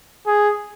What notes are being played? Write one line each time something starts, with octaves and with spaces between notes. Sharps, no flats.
G#4